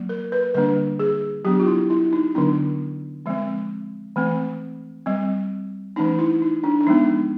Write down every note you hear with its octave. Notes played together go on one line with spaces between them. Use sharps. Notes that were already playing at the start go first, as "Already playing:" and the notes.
Already playing: F#3 A#3
A#4
B4
D3 G3 A#3 D4 B4
G#4
F#3 B3 D4 G4
F4
E4
E4
D#4
D3 F#3 B3 D4
F3 G#3 C4
E3 A3 C4
G3 C4
E3 A3 C#4 D#4
E4
D#4
D4
D4
F3 G#3 B3 D#4